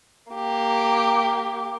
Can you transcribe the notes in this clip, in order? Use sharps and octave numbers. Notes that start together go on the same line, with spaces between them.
A#3 G4